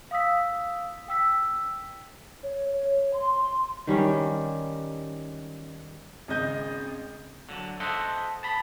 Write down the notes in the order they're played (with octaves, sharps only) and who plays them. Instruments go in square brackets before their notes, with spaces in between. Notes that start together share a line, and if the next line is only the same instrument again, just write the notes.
[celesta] F5 D#6 E6 B6
G5 E6 B6
[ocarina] C#5
C#5
C6
[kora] D#3 G3 C#4
[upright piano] G#1 C#3 D#5 G6
[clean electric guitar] D3 F#3
A4 C5 D#5 E5 F#5
A5 B5